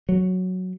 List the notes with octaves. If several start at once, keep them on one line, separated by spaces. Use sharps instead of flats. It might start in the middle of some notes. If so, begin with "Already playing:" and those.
F#3